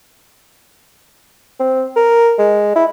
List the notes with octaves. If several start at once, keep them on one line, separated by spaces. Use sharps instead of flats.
C4
A#4
G#3
E4